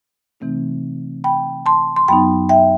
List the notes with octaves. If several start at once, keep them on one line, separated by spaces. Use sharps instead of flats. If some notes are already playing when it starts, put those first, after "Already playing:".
C3 E3 A3 C4 D#4
G5 B5
A5 C6
C6
F#2 F#3 B3 D#4 G5 B5
E5 G5